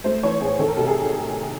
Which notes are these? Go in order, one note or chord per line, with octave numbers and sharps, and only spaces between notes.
A3 C5
E3 C#5
A2 G#4
D#3 A4
A#4
C3 A4
G#4